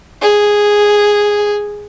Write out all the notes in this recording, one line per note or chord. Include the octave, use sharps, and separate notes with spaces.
G#4